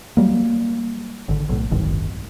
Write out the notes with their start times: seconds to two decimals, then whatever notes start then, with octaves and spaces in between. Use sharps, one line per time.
0.17 F#3 G3 A#3
1.29 G#1 D3
1.49 B1 A2
1.71 F#1 C2 G#2 D#3